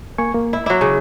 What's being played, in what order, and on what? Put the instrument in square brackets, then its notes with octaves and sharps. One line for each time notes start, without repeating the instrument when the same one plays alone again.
[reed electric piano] A#3 G#5 C#6
A#3
[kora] E4
[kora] F#3 E4 [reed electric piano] D6
[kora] C#3